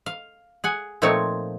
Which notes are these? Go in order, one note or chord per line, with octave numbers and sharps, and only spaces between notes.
F5
G#4 F#5 G#5
A#2 F3 A3 C4 D#4 C#5